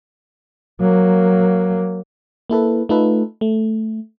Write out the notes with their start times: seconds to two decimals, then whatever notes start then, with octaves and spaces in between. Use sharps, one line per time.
0.81 F#3 A#3
2.50 A#3 E4 A4 B4
2.89 A3 D#4 F4 A4 B4
3.41 A3